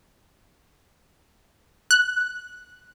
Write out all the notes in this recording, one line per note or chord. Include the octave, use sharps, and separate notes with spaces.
F#6